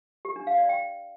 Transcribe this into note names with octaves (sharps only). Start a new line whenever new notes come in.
G4
D4
F5
D5
G5